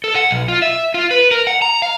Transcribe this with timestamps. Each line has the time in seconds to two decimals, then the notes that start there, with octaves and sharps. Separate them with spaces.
0.04 A4
0.15 F#5
0.31 B1
0.48 F4
0.62 E5
0.94 F4
1.11 B4
1.31 A#4
1.47 F#5
1.62 A#5
1.82 F5